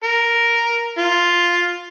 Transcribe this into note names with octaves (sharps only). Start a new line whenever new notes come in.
A#4
F4